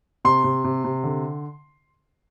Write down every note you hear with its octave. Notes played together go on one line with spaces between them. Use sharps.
C3 C6
C3
C3
C3
D3